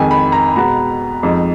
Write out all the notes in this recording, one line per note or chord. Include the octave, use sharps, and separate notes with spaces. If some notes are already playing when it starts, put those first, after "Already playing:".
Already playing: F2 D#3 G#3 G#5
B5
A#5
B2 G#3 B3 A#5
F2 F3 G#3 D#4